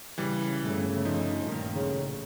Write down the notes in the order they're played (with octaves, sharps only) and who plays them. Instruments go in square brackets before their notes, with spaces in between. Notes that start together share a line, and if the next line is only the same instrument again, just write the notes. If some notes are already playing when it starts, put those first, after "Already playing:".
[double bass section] C#3 [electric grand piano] E3 G3
[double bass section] G1 C#3 A3
[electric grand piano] F3 [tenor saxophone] D#4
[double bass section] G2 A#2 D#3
[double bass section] A1 [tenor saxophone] C#3